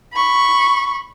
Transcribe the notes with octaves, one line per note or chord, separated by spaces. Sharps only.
B5 C#6